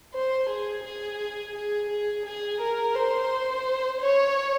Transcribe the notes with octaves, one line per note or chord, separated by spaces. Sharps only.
C5
G#4
G#4
G#4
G#4
G#4
A#4
C5
C#5